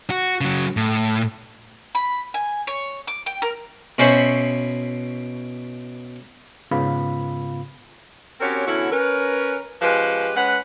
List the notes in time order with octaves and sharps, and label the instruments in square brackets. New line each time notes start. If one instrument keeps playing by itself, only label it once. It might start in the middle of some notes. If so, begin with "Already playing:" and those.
[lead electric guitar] F#4
C#3 F#3
A2
[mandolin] B5
G#5
C#5
D6
G5
A#4
[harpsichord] B2 C#4 E4 C5 B5
[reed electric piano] G#2 C#3 B3 F4 F5 B5
[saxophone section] C4 C#4 F#4 G4 A#4 C#5
E2 D3 C#4 E4 F#4 C#5
C#4 A#4 B4
F3 G#3 C#4 G4 B4
G#3 C#4 B4 F#5